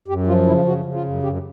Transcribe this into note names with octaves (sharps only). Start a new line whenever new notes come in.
F#2 G4
F3 F4
C#3 E4
C#3 F#4
C#3
F4
F#2
F#2 G4